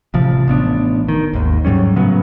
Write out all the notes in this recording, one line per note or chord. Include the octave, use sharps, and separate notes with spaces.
A1 C3 F3
A1 B3 D4
D#3
G#1 D#2
G#2 F#3 G3 C#4
A2 C#3 F#3 B3